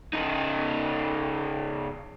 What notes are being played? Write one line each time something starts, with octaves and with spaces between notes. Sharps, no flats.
C#3 D#4